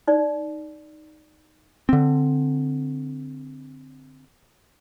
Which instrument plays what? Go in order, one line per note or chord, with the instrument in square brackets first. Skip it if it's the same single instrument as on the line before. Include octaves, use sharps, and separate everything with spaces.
[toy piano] D#4 D5
[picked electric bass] D3 C4